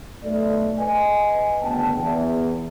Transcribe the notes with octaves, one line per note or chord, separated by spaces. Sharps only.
B1 A3 D5
B4 D#5 G#5
F#1 D2 B3 G5 A5
E2